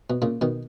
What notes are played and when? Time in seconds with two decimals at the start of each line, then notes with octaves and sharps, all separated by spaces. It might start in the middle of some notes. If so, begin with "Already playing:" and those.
0.10 B2
0.22 A#2 C#3
0.41 B2 D#3